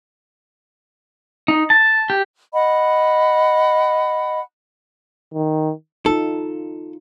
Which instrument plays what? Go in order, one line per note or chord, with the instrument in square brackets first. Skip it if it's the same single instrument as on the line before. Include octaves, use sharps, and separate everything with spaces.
[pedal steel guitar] D#4
A5
G4
[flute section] D#5 F#5 B5
[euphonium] D#3
[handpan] D#4 F4 [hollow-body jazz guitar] A4